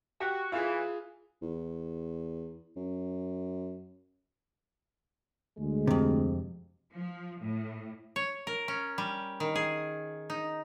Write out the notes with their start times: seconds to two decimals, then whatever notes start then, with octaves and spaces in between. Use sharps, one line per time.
0.20 F#4 G4
0.52 E3 F4 G#4
1.42 E2
2.76 F#2
5.58 D2 G#3
5.87 F2 C3
6.92 F3
7.40 A2
8.16 C#5
8.47 A#4
8.68 C#4
8.98 G3
9.40 D#3
9.55 G#4
10.30 D#4